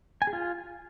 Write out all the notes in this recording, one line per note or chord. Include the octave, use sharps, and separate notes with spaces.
G#5
G#4
F4